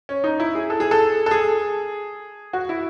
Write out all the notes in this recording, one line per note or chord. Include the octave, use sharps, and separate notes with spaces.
C#4
D#4
E4
G#4
A4
G#4
A4
A4
G#4
F#4
E4